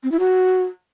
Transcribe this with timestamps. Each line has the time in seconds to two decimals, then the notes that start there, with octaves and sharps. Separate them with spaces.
0.03 C4
0.12 E4
0.20 F#4